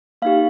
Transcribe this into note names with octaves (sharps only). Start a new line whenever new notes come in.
A#3 D#4 G4 F5